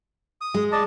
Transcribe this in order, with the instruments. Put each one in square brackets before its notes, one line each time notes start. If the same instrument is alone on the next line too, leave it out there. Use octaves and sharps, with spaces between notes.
[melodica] D#6
[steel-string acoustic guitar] G#3
[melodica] D5 D#5 A5